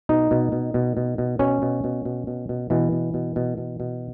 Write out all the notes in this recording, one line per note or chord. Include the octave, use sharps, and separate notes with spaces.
B2 D#4
B2
B2
B2
B2
B2
B2 C#4
B2
B2
B2
B2
B2
B2 E3
B2
B2
B2
B2
B2